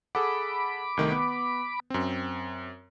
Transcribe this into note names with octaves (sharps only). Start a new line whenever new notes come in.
G#4 A4 F#5 B5 D6
C2 D#3 A3
B3
F#2 C4